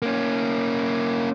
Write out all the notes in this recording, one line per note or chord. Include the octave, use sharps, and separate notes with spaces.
A#3 C#4